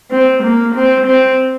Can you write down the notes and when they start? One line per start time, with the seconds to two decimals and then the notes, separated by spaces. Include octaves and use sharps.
0.11 C4
0.43 A#3
0.75 C4
1.07 C4